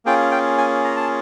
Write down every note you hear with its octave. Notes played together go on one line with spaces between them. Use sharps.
A#3 C#4 F4 G#4 G5
G5
G#5
A#5
A5